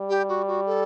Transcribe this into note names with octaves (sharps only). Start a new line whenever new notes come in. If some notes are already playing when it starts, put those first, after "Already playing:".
Already playing: G3
G4
F#4
F#4
A4